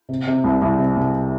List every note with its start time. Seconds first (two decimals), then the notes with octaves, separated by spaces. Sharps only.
0.09 C3
0.27 C3
0.44 C2
0.62 C2
0.79 C3
0.97 C2